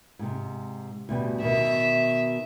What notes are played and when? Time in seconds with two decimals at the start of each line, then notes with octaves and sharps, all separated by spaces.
0.19 G#2 C3
1.09 D2 B2 G3
1.43 B2 D#3 E5